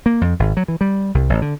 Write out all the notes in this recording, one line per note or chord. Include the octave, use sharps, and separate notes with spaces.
A#3
F2
G#1
F#3
E3
G3
C2
A1
D3